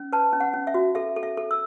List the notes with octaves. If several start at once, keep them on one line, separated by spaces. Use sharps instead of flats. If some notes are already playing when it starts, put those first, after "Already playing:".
Already playing: C#4
B4 A5
C#4
F#5
C#4
E5
F#4
A4 E5
A4
E5
A4
E6